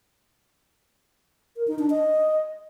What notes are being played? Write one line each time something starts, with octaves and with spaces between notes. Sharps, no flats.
A#4
D#4
D4
D#5